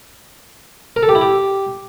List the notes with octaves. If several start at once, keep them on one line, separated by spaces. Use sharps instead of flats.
A#4
A4
G4
E4
G4